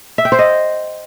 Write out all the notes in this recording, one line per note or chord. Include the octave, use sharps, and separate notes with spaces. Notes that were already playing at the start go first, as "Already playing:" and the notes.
E5
G5
C5
D#5